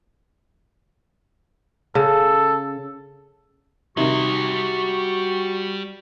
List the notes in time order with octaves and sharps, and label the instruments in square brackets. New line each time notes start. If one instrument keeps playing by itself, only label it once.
[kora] C#3 [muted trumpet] A4
[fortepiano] C3 D#3 [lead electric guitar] G3 C6 [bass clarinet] F#4 [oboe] C#6